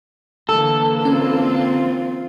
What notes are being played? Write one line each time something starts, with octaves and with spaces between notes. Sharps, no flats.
D3 E3 A#3 A4
C4 C#4 F4